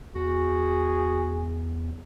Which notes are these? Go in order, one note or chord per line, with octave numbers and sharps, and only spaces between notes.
E2 F#4 G#4